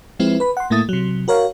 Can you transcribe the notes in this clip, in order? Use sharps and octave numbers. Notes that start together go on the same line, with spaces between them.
F3 G#3 C4 E4 B4
B4 B5
F#5 C6
A2 A3 A#3 E4 D#6 A6
C3 F#3
F#4 A#4 C#5 F5